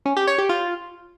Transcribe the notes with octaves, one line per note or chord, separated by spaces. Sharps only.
C#4
G4
C#5
G4
F4